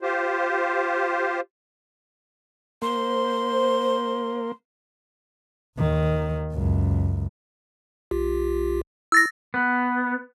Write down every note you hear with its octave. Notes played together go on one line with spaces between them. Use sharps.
F4 G4 C5
A#3 C5 C6
D#2 D#3
C#2 F#2
B1 F4 G4
E4 E6 A6 A#6
B3